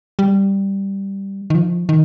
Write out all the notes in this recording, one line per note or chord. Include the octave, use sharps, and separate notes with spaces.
G3
D#3
F3
D#3